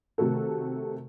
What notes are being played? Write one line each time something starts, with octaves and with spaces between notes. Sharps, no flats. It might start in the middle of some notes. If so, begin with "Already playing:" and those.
C3 D#3 A3 F#4 A4